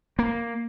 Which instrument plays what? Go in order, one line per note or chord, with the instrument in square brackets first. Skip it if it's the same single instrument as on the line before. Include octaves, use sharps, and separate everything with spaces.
[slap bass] A#3